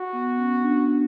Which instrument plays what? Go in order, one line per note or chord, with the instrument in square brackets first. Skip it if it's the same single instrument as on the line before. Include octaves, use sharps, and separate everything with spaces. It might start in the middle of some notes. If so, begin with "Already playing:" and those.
Already playing: [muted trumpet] F#4
[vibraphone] B3
C#4
D4